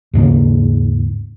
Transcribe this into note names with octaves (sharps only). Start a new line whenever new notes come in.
D#2 G#2 C#3 A#3